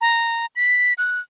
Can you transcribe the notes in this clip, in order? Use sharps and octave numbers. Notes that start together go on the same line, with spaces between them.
A#5
B6
F#6